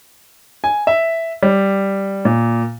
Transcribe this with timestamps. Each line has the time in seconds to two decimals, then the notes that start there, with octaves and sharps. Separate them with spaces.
0.64 G#5
0.87 E5
1.43 G3
2.25 A#2